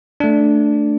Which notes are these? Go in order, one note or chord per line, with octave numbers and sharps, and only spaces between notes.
A3 D4